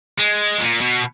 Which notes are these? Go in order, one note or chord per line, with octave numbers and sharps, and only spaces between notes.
G#3
A#2
B2